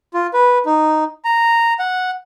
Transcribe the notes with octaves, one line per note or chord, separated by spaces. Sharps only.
F4
B4
D#4
A#5
F#5